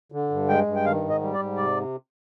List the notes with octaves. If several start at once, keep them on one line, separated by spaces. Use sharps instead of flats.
D3
G2
G#3 G5
G2
G5
D#3 F5
G#2
D#5
G3
D5
G#2
C3 D5